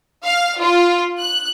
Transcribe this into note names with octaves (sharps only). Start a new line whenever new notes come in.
F5
F4
F#6